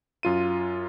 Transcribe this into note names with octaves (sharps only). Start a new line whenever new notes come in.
F#2 F4 D#7